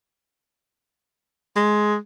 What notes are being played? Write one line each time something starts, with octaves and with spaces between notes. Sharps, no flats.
G#3